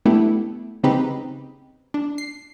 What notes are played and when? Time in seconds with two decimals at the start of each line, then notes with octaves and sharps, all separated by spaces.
0.05 A3 B3 D4 E4 G4 A4
0.83 C#3 C4 D#4 G4 B4
1.94 D4
2.18 C7